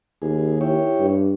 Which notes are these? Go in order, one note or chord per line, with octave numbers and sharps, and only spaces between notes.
D#2 G#4
E4 G4 C#5
G2